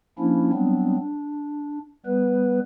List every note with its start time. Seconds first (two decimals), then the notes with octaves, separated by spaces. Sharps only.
0.19 F3 A#3 C#4 D4 E4
0.53 F#3 G3 B3 C4 D4
0.99 D4
2.06 G3 B3 B4